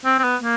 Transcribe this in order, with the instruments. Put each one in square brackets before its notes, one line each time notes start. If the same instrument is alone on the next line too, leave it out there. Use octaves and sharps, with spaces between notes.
[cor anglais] C4
C4
B3
A#3